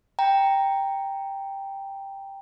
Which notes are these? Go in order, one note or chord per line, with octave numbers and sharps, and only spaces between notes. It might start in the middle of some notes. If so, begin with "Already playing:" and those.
G5 A#5